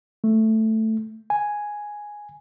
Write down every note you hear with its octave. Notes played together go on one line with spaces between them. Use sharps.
A3
G#5